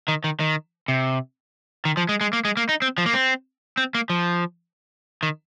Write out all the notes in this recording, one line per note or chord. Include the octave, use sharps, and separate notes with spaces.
D#3
D#3
D#3
C3
D#3
F3
G#3
G#3
A#3
G#3
A#3
D#4
C4
F3
A#3
C4
C4
A#3
F3
D#3